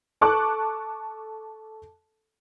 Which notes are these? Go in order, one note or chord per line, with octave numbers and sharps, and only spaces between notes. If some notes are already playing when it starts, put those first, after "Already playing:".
A4 A5 C#6 D6 F#6